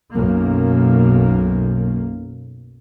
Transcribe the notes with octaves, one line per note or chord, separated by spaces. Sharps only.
B1 F#2 A#3